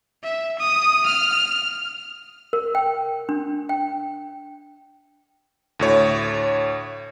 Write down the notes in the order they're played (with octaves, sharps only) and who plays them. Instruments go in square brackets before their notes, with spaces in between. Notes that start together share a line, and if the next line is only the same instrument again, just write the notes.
[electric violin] E5
D#6
F6
[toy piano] A#4
G5
D4
G5
[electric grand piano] D2 A2 C#5